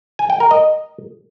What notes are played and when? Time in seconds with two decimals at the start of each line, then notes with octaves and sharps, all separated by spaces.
0.19 G#5
0.30 G5
0.40 A#4
0.51 D#5